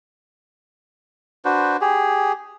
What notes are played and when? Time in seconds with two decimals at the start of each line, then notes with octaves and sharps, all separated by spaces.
1.45 D4 F#4 B4 C5
1.81 G4 G#4